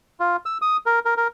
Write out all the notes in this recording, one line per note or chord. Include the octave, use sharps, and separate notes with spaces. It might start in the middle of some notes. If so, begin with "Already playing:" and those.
F4
E6
D#6
A#4
A#4
A#4